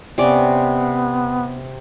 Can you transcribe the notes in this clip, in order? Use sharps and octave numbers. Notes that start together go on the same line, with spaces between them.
C3 B3 C#4 D5